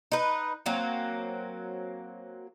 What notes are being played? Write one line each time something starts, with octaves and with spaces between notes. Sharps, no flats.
D#4 B4
F#3 A#3 C4